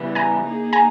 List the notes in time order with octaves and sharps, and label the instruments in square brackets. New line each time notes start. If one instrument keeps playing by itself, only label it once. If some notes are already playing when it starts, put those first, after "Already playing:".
Already playing: [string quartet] C#3 E3 G3 B3
[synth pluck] G#5 A#5
[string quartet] A#3 D#4 G#4
[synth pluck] G#5 A#5